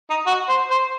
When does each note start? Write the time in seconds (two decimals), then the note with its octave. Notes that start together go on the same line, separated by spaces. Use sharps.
0.10 D#4
0.27 F#4
0.49 C5
0.71 C5